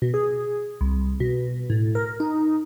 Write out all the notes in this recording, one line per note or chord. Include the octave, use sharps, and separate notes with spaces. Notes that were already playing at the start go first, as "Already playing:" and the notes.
B2
G#4
C2
B2
A2
A#4
D#4